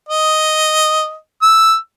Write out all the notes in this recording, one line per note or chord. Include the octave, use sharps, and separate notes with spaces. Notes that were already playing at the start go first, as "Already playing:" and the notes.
D#5
E6